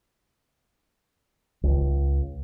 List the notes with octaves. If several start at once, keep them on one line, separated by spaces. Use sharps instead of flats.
C#2